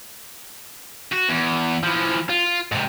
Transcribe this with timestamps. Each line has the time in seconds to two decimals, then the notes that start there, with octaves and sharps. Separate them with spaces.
1.12 F#4
1.28 E2
1.83 E3 F3
2.30 F4
2.72 G#2 C3